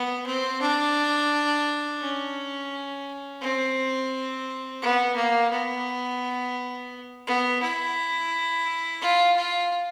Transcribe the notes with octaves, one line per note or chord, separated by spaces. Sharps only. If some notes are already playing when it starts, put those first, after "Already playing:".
Already playing: B3
C4
D4
C#4
C4
B3
A#3
B3
B3
E4
F4
F4